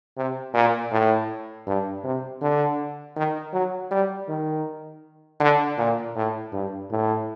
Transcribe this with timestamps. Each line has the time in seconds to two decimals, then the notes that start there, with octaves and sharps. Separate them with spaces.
0.17 C3
0.54 A#2
0.92 A2
1.66 G2
2.04 C3
2.41 D3
3.16 D#3
3.53 F#3
3.91 G3
4.29 D#3
5.40 D3
5.78 A#2
6.15 A2
6.53 G2
6.91 A2